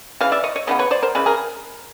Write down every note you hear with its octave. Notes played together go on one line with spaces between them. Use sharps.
C#3 E3 F5
D5 E5
C#5 D#5
C#5 D#5
C#3 E3 B3 D#5
B4 C#5
C5 D5
A#4 C5
C#3 E3 G#3 B4
G#4 A#4